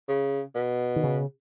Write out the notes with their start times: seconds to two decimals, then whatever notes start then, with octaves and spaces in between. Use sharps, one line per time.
0.08 C#3
0.55 B2
0.96 D#3
1.03 C#3